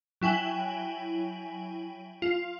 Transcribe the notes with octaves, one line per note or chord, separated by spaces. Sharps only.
F#3 E4 G5 G#5 F#7
F4